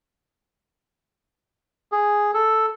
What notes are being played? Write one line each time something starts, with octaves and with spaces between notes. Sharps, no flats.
G#4
A4